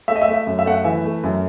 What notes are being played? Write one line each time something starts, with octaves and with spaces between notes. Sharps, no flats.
A3 E5
D#5
E5
A3
E5
F#2
E5
A3 F#5
E5
E3 E5
A3
F#2